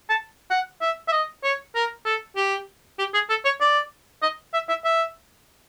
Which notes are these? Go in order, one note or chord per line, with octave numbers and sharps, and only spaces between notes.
A5
F#5
E5
E5
D#5
C#5
A#4
A4
G4
G4
G#4
A4
C#5
D5
D#5
E5
E5
E5